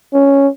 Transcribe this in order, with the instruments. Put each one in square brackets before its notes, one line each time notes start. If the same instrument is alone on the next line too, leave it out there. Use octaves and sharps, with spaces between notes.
[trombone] C#4